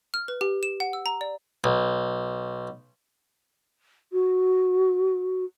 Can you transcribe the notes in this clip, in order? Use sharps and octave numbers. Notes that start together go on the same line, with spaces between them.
F6
B4
G4
E7
F#5
E6
A#5
D5
B1
F#4